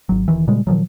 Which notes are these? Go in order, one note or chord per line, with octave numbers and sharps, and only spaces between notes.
G#1 F#3
E1 D2 D#3 E3
A#2 C#3 G3 G#3
A#2 D#3 F3 F#3